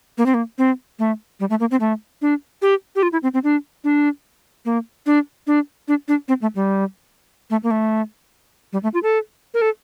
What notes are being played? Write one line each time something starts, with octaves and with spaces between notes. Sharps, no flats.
A#3
C4
A#3
C4
A3
G3
A3
A#3
C4
A3
D4
G4
G4
F4
E4
C4
C4
D4
D4
A#3
D4
D4
D4
D4
C4
A3
G3
A3
A#3
A3
G3
A3
F4
A4
A#4
A4